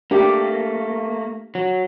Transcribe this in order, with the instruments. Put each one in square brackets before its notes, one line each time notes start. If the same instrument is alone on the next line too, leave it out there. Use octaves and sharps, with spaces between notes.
[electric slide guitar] A3 A#3 [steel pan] D4 G4
[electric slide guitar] F#3